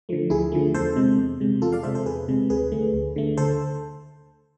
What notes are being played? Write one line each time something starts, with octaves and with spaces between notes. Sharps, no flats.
D3 F3 A3
D2 E4 G#4
D3 F3 A3
E2 A4 C5
C3 G#3
E2
C3 G#3
E2 F4 A4
D5 F5
C3 G#3 C5 E5
A4 C5
E2 G#4 B4
C3 G#3
D2 G#4 B4
D3 A3
D2
D3 A3
D2 A4 C5